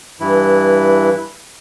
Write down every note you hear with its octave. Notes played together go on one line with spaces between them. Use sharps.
G2 E3 E4